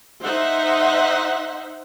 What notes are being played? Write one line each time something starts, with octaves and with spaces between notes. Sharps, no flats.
D#4 C5 E5 F#5